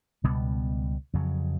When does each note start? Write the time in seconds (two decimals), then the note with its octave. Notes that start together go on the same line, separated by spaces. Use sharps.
0.24 C#2 B2 G3 B3
1.13 F2 C#3 F#3